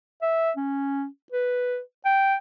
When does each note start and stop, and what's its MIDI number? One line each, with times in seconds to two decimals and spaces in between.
0.22 0.51 76
0.57 1.06 61
1.32 1.79 71
2.05 2.35 79